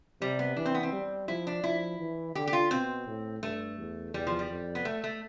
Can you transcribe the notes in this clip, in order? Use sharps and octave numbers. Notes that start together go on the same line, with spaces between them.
C3 G3
B3
E3 D4
C4
B3
C4
G3
F3 E4
D4
F3 E4
E3
D3 G4
G4
F4
B2 C4
A2
G2 A3
E2
E2 G3
F3
G3
F2
B3
A3
A3